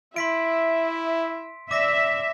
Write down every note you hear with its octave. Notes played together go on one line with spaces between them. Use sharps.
E4 E5 C6 B6 D7
D5 E5 D6 A#6 B6